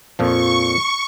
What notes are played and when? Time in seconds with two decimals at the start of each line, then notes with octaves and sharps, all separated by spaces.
0.19 F2 A#2 F3 C#6